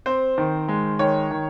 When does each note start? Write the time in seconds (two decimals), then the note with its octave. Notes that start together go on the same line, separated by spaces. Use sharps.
0.06 C4 C5
0.38 D#3
0.68 G#3
0.99 D#3 C#5
1.31 D#3